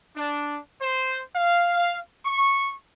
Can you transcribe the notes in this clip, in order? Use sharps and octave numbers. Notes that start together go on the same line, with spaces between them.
D4
C5
F5
C#6